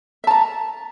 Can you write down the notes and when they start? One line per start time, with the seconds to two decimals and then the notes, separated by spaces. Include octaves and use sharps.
0.24 E5
0.27 A5
0.31 A#5